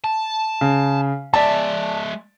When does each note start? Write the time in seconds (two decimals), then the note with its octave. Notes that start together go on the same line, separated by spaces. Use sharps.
0.04 A5
0.61 C#3
1.34 G#3 D5 E5 A5